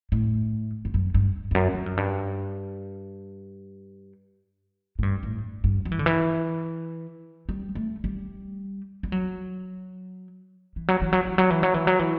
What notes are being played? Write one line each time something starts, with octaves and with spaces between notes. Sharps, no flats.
A2
G2
F#2
G2
E2
F#2
G2
F#2
G2
A2
G2
A2
G2
F#3
E3
D3
E3
G3
A3
G3
G3
F#3
E3
F#3
E3
F#3
E3
F#3
E3
F#3
E3
F#3
E3